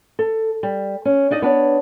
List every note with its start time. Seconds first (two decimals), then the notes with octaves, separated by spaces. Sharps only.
0.19 A4
0.63 G3
1.05 C#4
1.31 D4 D#4 D5 D#5
1.42 B3 D4 C#5